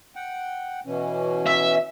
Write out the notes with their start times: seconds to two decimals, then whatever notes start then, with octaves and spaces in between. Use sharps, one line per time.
0.16 F#5 G5
0.86 B2 E3 C#4
1.47 E5